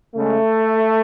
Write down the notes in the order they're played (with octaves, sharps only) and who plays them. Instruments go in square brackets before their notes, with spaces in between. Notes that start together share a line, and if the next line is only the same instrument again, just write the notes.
[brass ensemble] C#3 G#3 A3